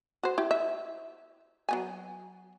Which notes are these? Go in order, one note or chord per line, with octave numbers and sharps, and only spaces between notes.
F#4 C5
E4 G4
E5
F#3 B3 G#5